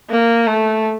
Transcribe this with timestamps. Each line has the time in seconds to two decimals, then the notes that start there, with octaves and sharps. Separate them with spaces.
0.10 A#3
0.47 A3